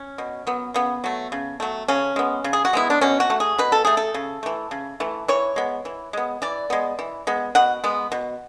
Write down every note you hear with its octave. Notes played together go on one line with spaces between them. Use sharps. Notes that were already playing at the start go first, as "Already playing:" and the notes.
Already playing: C#4
B2
F#3 B3
C#3 B3
F#3 A3
C#3
F#3 A3
C#3 C#4
G#3 B3
C#3
G#4
F#4
G#3 B3 E4
D4
B2 C#4
F#4
A3
G#4
B2 B4
A4
A3 G#4
A4
C#3
E3 A3
C#3
E3 A3
E3 C#5
G#3 B3
E3
G#3 B3
E3 D5
G#3 B3
E3
G#3 B3
B2 F#5
G#3 B3
B2